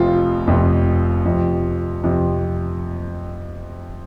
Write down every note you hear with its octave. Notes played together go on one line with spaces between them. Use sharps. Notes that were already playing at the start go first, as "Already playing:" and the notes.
Already playing: F1 F2 C3 F3 F4
F1 F2 C3 F3
F2 C3 F3
F2 C3 F3